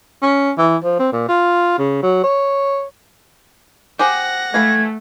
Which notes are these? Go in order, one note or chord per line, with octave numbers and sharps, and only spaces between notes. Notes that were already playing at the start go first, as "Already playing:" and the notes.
C#4
E3
F3
C4
A#2
F4
C#3
F#3
C#5
G4 G#4 C5 F#5 A#6
E3 A3 F5 B5 G#6